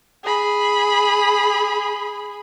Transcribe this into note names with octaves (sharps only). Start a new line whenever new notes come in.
G#4 B5